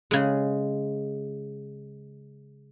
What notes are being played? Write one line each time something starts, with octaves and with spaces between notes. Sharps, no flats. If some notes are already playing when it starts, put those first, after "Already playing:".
C#3 G#3